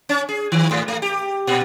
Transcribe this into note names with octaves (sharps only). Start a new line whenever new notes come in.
C#4
G#4
D#3
G#2
A3
G4
A#2